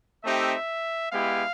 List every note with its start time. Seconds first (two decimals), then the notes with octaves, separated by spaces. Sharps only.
0.24 A3 C4 D#4 G4 E5
1.12 G#3 B3 E4 G4 F5